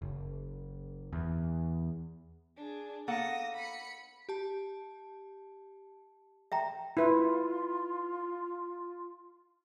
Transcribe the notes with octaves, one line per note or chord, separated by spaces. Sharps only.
F#1
E2
D4 G#4
A#3 A4 F#5 D#6 A#6
B5 C#7
G4 A5
E5 G5 A#5
E4 F4 B4